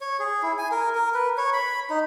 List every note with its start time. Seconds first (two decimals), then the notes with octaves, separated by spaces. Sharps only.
0.01 C#5
0.20 G#4
0.43 E4
0.59 G#5
0.72 A#4
0.95 A#4
1.14 B4
1.38 C#5
1.53 B5
1.90 D#4